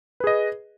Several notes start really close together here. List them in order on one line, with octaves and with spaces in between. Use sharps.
B4 G#4 D#5